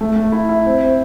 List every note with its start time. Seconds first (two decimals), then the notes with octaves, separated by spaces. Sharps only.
0.01 A3
0.16 A3
0.32 E4
0.49 E4
0.66 C4
0.82 C4